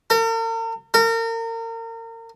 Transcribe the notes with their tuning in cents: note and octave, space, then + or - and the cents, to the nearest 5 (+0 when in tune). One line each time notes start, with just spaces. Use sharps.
A#4 -45
A#4 -35